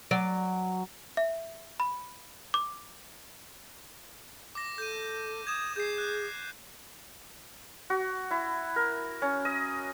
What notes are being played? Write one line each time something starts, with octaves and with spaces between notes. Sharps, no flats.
F#3 D5
E5
B5
D6
D6 A#6
A4 G6 D#7
D#6 G#6 E7
G#4 G6 C7
F#6
F#4
E4
A#4
C#4
D#5